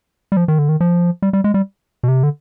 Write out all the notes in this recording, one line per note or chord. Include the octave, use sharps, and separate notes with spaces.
G3
F3
D#3
D3
D#3
F3
G3
G3
G#3
G3
B2
C3
D3